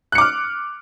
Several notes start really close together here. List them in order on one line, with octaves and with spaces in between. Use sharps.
F#6 C#7 D6 F6